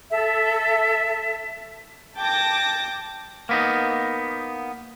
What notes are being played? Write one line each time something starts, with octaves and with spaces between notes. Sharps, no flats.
A4 E5
G5 A5 D6 A#6
A#3 B3 D#4